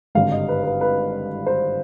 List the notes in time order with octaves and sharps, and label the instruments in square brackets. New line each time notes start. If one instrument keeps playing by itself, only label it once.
[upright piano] G#1 G2 D3 G3 F5
D#5
B4
B4
B4
C5